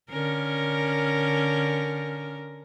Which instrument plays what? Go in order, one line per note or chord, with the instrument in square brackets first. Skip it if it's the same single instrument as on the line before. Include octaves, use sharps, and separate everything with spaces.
[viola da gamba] D3 C#4 A#4